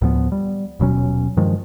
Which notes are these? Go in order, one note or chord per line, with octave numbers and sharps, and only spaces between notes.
D2 A2 F3 B3
G3
D#1 B2 F#3 C#4
G2 D#3 F3 G#3